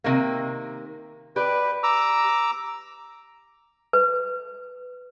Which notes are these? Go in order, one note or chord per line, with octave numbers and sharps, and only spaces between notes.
C3 D#3 A#3
G4 B4 D5
A#5 D6 E6
B4